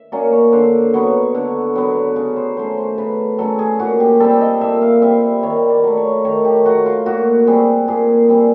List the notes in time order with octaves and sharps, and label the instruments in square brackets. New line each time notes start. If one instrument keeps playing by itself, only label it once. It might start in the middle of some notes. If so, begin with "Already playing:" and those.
Already playing: [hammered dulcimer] E5
F#3 A#3 C#4 D5
C#5
D3 C5
F#3 B3 C#5
D3
F#3 B3
C#3
C5
F#3 A3 C#4 C5
C5
C#3 B4
F#3 A3 C#4 A4
G#4
A#2 F#4
G4
G3 C4 A4
D#5
A#2 E5
F5
G3 C4 E5
D#3 C#5
D5
F#3 A3
C#5
D#3 C#5
G4
F#3 A3 F#4
F4
A#2 F#4
G3 C4 G#4
A#2 G#4
G3 C4